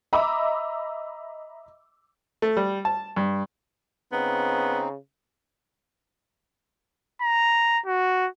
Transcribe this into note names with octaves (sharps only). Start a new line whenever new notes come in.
D#5 E5 A#5 B5 D6 E6
A3
G3
A5
G2
C#3 B3 C4 D#4
A#5
F#4